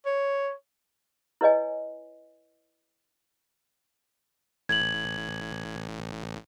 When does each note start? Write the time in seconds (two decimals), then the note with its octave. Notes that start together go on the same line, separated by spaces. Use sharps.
0.06 C#5
1.41 E4 B4 C#5 D#5 G#5
4.69 A1 G#6 F#7